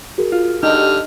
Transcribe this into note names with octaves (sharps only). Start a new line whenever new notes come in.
F#4 G#4 A#4
F4
D3 D#4 G4 F6